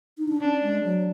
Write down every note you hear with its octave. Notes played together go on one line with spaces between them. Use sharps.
D#4
D4
C#4 D4
G#3
F#3